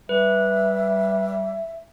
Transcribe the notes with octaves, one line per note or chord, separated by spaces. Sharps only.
G3 B4 E5